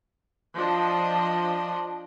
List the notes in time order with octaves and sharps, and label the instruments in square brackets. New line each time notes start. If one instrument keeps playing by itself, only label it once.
[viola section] F3 D4 D#5